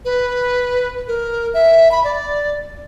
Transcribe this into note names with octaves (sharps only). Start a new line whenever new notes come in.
B4
A#4
E5
B5
D5